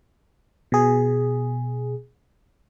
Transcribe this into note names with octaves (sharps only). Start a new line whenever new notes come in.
B2 G#4